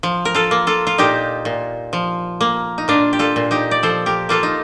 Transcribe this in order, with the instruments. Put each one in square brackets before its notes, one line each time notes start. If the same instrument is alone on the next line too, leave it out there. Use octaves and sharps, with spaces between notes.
[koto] F3
A#4
F4 A4
A#3
F4 A4
F4
A#2 D#4 G4
A#2
F3
A#3
D#4
A#2 D4 F4
G4
F4 A4
A#2
D#4 G4
D5
F3 A4 C5
G4 A#4
A#3 F4 A4
D#4